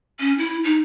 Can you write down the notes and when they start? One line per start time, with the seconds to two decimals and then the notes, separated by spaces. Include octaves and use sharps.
0.20 C#4
0.38 E4
0.64 D#4